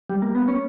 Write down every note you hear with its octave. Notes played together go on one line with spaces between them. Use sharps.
G3
A#3
B3
C#4